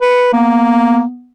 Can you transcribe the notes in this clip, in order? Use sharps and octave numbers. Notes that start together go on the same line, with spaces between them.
B4 C#7
A#3 B3